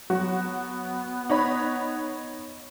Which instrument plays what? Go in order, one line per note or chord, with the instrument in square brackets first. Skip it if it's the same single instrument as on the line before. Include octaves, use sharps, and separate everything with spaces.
[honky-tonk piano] F#3 F#4 [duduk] B3
[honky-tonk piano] D#4 C#5 B5